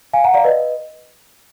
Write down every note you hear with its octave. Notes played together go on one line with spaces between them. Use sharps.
F5 G#5
F#5 A#5
D5 F5
B4 D#5